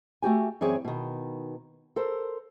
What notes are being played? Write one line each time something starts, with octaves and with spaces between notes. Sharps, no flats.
A3 F#4 G4 G#5
F#2 E3 C4 G#4 C#5 D5
B2 D#3
A4 A#4 C5